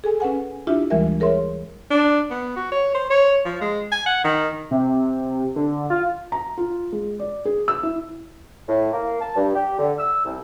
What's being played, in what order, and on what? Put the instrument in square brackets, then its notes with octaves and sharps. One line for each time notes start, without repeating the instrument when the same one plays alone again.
[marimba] G#4 A4 G#5
C#4 B4 F#5 G#5
D4 E4 F4 G4 E5
D2 E3 G3 G#3 A#4 E5
G#4 A#4 C#5 E5 C6
[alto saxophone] D4
B3
F#4
C#5
C5
C#5
F3
G#3
G#5
F#5
D#3
[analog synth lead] C3
D3
F4
[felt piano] A#5
F4
G#3
D5
G#4
E6
E4
[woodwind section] A2
A#3
A5
G2
G4
D3
E6
C2